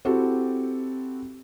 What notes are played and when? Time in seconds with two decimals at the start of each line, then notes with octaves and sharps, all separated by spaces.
0.05 C4 E4 F#4 G4 A4